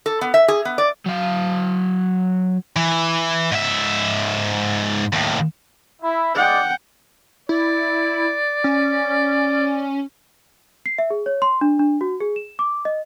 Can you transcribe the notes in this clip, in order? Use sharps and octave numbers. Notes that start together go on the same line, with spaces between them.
A4
B3
E5
G#4
B3
D5
F#3 F5
E3
G#2 E5
D#2 A2
E4
G#3 D5 F#5 G5
E4 D5
C#4
C7
E5
G#4
C#5
C6
D4
D4
F#4
G#4
E7
D6
D#5